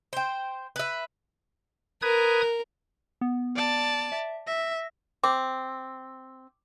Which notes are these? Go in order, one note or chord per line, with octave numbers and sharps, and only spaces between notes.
C5 G5
B4 E5
A#4 B4 D#6 G#6
B3
D5 A5
E5
E5 A#6
C4 D6